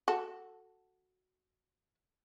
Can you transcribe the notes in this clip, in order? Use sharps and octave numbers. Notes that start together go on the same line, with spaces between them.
F#4 A4